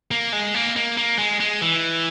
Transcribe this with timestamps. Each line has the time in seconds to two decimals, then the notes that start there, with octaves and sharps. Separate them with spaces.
0.11 A#3
0.33 G#3
0.54 A#3
0.76 A#3
0.97 A#3
1.19 G#3
1.40 G#3
1.62 E3